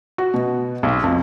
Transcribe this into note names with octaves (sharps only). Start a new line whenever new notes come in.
F#4
B2
B1
F2